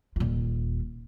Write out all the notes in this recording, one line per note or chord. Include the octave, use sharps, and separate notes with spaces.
D#1 F4